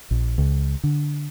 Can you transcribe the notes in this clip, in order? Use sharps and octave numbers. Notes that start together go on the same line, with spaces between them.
A#1
C#2
D3